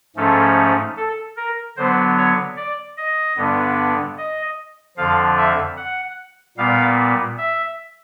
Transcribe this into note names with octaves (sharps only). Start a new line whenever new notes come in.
G#2 F3 A3 C#4 A4
A4
A#4
D3 F#3 B3 C5
C#5
D5
D#5
G2 D3 G3 B3
D#5
F2 D3 F3 F5
E5
F#5
A#2 G3 B3 F5
E5